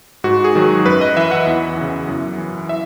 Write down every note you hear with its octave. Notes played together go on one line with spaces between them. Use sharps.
G#2 F#4
G#4
D#3 F#3
F#2 B4
D#5
E3 E5
F#5
E2
C#3 E3
F#2
E3
E5